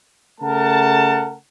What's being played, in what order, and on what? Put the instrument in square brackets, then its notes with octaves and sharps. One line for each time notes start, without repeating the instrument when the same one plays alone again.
[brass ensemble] C#3 A3 A#4 F#5 A5